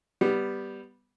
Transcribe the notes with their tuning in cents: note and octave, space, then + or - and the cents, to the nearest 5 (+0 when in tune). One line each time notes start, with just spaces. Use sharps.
G3 +0 B3 +0